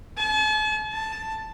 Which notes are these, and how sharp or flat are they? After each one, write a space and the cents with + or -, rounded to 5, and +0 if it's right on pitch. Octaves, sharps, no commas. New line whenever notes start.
A5 -45
A5 +0